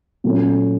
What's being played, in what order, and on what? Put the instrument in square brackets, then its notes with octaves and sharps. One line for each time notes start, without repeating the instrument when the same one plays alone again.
[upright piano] A#2 F#3 A3 C#4